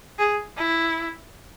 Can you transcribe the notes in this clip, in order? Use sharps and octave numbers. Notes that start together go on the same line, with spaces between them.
G#4
E4